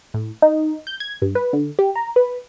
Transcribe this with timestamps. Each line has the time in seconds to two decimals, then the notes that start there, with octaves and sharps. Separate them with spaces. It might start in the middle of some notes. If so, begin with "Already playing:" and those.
0.14 A2
0.42 D#4
0.87 G6
1.00 G#6
1.22 G2
1.35 B4
1.53 D3
1.79 G4
1.96 A#5
2.16 B4